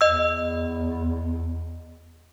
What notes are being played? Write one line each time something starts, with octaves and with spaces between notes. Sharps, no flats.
E2 D#5 E6